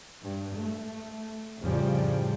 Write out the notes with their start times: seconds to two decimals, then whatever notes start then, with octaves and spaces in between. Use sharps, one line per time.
0.21 G2
0.55 A3
1.60 F2 A2 C#3 F3 G3